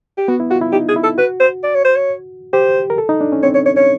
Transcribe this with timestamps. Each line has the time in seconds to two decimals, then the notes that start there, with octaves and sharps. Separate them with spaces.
0.18 G4
0.28 B3 F#4
0.40 E4
0.51 F4 F#4
0.61 E4
0.73 D#4 G4
0.89 G#4
0.96 E4
1.03 A4
1.18 F#4 B4
1.40 C5
1.64 D5
1.75 C#5
1.85 C5
1.96 C#5
2.53 G4 C5
2.90 A#4
2.98 A4
3.09 D#4
3.21 D4
3.32 C#4
3.43 C4 C#5
3.55 C#5
3.66 C#5
3.77 C#5